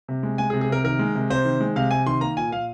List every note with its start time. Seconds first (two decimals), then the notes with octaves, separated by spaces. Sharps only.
0.08 C3
0.23 G#3
0.38 G#3 G#5
0.50 G#4
0.54 C3
0.61 G#4
0.70 C3 A#4
0.84 D#3 A#4
0.99 G#3
1.15 C3
1.30 C3 C5
1.45 D#3
1.60 G#3
1.76 C3 F5
1.91 C3 G#5
2.06 D#3 C6
2.21 A#3 A#5
2.37 A#2 G#5
2.52 A#2 F5